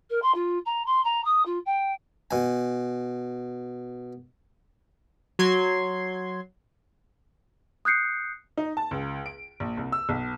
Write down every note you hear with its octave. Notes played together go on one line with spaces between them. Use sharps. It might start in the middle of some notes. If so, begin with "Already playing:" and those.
A#4
C6
F4
A#5
C6
A#5
D#6
F4
G5
B2 G#5
F#3 C6 G#6
D#6 F#6 G6 C7 C#7
D#4
A5
C#2
D7
A#1
C2
E6
B1